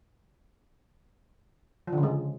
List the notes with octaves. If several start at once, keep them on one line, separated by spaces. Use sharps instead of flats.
F3
D3
C#3
G#3